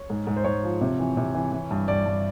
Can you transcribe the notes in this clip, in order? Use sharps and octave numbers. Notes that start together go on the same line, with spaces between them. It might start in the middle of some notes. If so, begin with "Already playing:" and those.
Already playing: C#5
G#2
G#2
C5
G#2 C#5
F3
C3
E3
C3
E3
E3
G2
G2 D5
G2